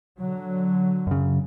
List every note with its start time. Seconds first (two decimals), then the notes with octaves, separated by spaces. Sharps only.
0.21 D3 F#3
1.07 F#2 C#3